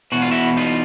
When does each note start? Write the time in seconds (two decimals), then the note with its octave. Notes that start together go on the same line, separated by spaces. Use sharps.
0.12 E2 B2 F#4
0.22 F4
0.31 E4 F#4
0.57 D#4 F4